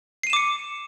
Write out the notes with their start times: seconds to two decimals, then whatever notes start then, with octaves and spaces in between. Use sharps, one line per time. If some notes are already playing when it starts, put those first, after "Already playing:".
0.23 C7
0.27 D#7
0.30 E7
0.33 D6
0.36 C#7